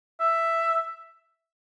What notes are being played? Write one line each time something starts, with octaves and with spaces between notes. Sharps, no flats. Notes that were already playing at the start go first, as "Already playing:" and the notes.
E5